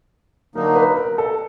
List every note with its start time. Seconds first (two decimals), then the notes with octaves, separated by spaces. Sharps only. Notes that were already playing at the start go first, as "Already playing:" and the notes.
0.55 D3 F#3 A#3 D#4 A#4
0.76 B4
0.97 A#4
1.18 A4